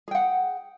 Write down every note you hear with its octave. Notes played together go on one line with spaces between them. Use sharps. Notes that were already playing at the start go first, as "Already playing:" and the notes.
G#4 F#5 G5